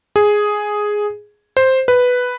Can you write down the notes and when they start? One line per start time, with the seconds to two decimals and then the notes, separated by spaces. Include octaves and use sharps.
0.16 G#4
1.57 C5
1.88 B4